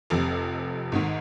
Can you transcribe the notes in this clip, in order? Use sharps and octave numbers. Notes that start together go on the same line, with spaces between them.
F1 F2 C3
G#1 G#2 D#3